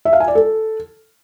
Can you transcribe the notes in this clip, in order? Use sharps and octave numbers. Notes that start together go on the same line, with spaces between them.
E5
F5
G#5
D5
A4